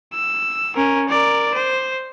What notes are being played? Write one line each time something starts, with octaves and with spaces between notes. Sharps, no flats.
E6
C#4 A#4
A#4 D5
C5